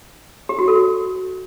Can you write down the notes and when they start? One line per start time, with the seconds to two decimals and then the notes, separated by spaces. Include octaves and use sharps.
0.49 G4
0.59 F#4
0.68 A4